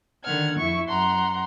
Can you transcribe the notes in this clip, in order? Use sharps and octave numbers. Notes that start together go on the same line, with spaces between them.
D3 D#3 F#5 F6 G#6
F2 E4 C#6
F#2 F#5 A#5 C6